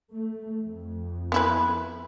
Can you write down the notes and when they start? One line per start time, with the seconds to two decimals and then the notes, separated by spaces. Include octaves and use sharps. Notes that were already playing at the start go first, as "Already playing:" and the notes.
0.14 A3
0.62 F2
1.32 B3 E4 B4